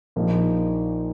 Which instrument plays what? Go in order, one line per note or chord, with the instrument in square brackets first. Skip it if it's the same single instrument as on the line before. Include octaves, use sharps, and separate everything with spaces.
[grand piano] A#1 A#2 F3 A#3 D#4